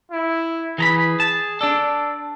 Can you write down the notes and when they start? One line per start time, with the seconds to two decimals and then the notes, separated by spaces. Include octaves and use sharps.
0.11 E4
0.78 E3 G#4 A#5 B5
1.20 A5
1.61 D4 A4 D5